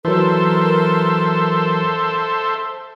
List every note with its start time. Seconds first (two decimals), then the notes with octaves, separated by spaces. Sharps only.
0.05 E3 F#3 A4 A#4 C5 E5